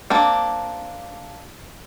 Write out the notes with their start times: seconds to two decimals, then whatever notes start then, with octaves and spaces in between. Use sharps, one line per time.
0.10 A#3 C4 D4